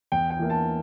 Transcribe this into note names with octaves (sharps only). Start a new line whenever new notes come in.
E2 G5
G5
E3 A#3 E4
A5